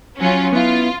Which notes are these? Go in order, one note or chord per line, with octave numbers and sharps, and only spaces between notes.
F#3 C#4 F4
B3 E4 F4